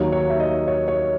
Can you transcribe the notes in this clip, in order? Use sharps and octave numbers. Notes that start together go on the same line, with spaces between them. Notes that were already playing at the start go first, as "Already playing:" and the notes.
Already playing: D#2 D#3 F#3 C#5
C#5
E5
D#5
C#5
C#5